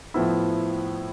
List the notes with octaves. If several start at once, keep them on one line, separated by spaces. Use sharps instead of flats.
A2 F3 B3 E4